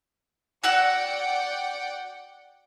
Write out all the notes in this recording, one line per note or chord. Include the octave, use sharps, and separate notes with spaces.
F#4 D5 F#5 G5 E6 F#6